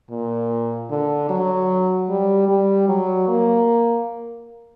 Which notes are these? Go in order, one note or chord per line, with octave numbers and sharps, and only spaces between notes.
A#2
D3
F#3
G3
G3
F#3
A#3